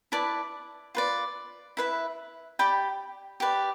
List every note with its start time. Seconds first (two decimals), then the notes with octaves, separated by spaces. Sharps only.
0.12 E4 B4 D5 A5
0.95 F4 B4 D5
1.77 E4 B4 E5
2.59 G4 D5 G5 B5
3.40 G4 B4 D5